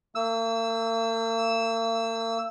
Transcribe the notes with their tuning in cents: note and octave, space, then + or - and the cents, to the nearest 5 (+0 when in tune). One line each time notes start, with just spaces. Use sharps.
A#3 -45 E6 +0